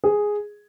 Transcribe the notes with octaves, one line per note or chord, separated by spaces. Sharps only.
G#4